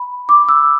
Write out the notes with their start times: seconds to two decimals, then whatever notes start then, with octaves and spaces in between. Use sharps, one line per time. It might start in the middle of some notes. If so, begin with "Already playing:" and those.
Already playing: B5
0.29 D6
0.49 E6